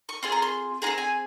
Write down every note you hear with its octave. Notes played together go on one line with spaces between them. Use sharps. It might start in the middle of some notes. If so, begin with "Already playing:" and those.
C#6
C4 F4 G#4 C6
A#5
C6
C4 F4 G#4 A#5
G#5